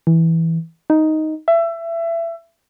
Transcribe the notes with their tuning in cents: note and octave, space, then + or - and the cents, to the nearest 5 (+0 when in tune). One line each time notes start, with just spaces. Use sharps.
E3 -10
D#4 +5
E5 +25